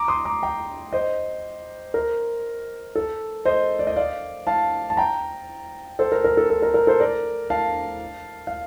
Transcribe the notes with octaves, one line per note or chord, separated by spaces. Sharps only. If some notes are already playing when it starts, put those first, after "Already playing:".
Already playing: A#5 D6
C6 D#6
A#5 D6
G5 A#5
C5 D#5
A#4
A4
C5 D#5
D5
D#5
D5 F5
F5 A5
A5
G5 A#5
A4 C5
A#4
A#4
A4
A4
A#4
A#4
A4 C5
A#4 D5
F5 A5
F5